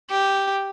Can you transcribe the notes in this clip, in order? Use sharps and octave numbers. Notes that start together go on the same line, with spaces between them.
G4